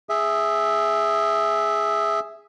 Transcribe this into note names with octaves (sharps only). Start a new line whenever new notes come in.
G#4 E5